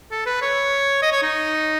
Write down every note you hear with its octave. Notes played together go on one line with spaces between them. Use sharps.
A4
B4
C#5
D#5
C#5
D#4